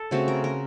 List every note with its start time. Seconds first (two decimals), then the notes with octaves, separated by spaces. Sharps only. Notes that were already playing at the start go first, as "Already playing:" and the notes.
Already playing: A4
0.11 C#3 A3 C4 F#4
0.28 A#4
0.44 A#4